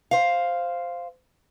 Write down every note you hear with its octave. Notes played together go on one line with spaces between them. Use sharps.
C5 F5